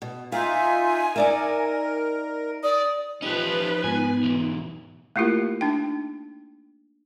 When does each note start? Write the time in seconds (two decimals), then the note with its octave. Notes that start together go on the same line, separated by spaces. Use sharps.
0.02 B2
0.32 D#4 F4 E5 F5 G#5
1.16 D#4 A#4 D5 E5
2.63 D5 D#6
3.22 F3 C#4 D#4 G4 B4 D#5
3.84 G#2 B3 G#5
4.23 B1 E3
5.16 A3 A#3 E4 F4 G4 A#4
5.61 D4 D#4 G5